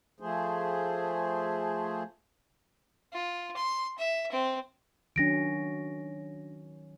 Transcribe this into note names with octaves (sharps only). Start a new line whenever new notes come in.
F3 A3 G#4 C5
F4
C6
E5
C4
D#3 F#3 C#4 D4 A#6 D7